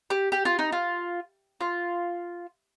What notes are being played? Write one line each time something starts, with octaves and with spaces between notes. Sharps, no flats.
G4
G4
F4
D#4
F4
F4